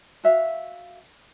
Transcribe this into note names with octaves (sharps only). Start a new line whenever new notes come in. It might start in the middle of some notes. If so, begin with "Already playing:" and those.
F#4 E5 F5